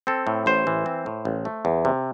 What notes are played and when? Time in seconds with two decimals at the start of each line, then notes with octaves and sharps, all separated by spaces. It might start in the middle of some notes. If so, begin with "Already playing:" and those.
0.07 C4 A4
0.27 A2
0.46 A1 C5
0.67 E3
0.86 C4
1.06 A2
1.25 A1
1.45 A3
1.65 E2
1.85 C3